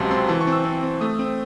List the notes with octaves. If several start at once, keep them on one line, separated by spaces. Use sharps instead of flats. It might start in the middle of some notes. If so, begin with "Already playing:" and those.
Already playing: C#2 C3 F#3 G#5 A5 C6
C4 C6
E3 A5
C#6
C4
E6
C4
C4
A3 D#6
C4